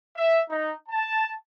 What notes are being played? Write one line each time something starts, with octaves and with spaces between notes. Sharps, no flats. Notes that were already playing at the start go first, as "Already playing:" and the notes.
E5
D#4
A5